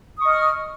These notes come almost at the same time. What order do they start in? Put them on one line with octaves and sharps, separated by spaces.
D#6 C#6 D#5 F6